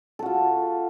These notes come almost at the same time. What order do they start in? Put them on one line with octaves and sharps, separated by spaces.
A4 F#4 F4